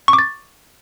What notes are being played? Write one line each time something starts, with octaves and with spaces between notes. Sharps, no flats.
C#6
D6
A6